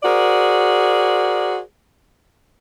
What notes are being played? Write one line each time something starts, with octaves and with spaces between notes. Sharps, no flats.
F#4 G#4 A#4 C5 D5